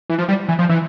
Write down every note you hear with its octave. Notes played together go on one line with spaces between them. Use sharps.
E3
F3
G3
E3
F3
E3